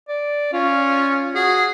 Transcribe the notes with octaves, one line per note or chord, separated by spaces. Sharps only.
D5
C#4 F4
F#4 G#4